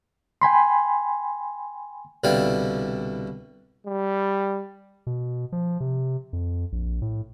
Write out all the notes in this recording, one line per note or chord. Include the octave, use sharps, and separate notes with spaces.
G5 G#5 B5 C6
C2 B2 D3 E4 F5 G5
G3
B2
F3
C3
F2
A#1
A2